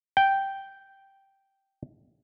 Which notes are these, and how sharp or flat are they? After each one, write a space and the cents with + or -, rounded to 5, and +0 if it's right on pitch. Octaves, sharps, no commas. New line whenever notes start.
G5 -5